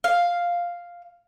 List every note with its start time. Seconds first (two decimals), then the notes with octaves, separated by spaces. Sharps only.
0.04 F5